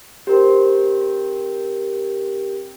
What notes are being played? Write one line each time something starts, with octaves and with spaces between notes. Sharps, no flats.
C4 G4 A#4 C5